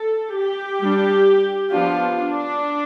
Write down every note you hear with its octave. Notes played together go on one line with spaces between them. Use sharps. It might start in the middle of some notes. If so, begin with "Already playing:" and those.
Already playing: A4
G4
G3 D4
F3 B3 D4 F4
D4